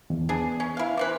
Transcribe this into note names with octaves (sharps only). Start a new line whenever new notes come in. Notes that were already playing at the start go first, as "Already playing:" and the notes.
E2
B3 D4 G#4
C#4
E4 F5
E3 C4 B4 D6